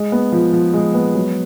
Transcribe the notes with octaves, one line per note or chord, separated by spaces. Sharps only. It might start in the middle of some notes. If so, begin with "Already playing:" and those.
Already playing: G#3
B3
F3
F3
G#3
B3
F#3